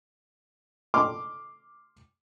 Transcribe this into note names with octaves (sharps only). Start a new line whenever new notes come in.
C6 D6 F6